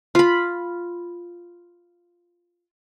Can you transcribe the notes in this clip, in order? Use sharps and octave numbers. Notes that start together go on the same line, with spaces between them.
F4 B5